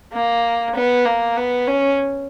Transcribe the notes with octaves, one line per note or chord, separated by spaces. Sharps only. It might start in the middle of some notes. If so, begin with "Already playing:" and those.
A#3
B3
A#3
B3
C#4